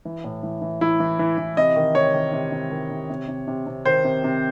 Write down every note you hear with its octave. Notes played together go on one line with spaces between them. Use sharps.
E3
A2
E3
E3
E3 E4
E3
E3
E3
C3 D#5
D#3
C3 C#5
D#3
C3
C3
D#3
C3
C3
C3
C3
C3
D#3 C5
C3
C3